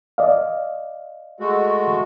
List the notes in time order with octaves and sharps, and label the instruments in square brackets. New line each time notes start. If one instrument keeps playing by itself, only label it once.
[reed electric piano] D5 D#5 F5
[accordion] G#3 A3 F#4